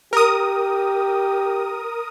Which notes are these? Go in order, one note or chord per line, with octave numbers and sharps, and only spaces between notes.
G4 A#4 D#6